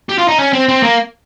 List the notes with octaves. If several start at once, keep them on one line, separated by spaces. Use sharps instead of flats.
G4
F4
D#4
C#4
C4
C4
A#3